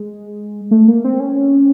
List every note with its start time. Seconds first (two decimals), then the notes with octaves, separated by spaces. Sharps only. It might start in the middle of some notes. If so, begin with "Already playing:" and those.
Already playing: G#3
0.71 A3
0.88 A#3
1.04 C4
1.20 C#4